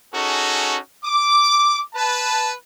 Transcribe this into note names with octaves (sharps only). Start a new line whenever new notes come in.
C#4 D#4 F#4 G#4 A4
D6
B4 A5